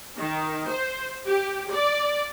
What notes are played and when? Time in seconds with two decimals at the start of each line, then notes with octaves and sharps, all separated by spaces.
0.18 D#3
0.69 C5
1.25 G4
1.73 D5